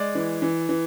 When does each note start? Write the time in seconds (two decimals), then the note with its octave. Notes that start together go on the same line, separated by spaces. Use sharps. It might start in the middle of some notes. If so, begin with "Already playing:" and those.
Already playing: G#3 D5
0.15 E3
0.42 E3
0.69 E3